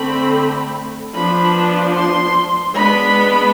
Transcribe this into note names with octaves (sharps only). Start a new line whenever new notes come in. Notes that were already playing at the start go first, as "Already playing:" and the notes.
Already playing: D3 A3 C4 B5
F3 B3 D4 B5
C6
G#3 B3 D4 B5